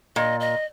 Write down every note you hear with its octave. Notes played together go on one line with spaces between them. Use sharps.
A#2 D#5
D#5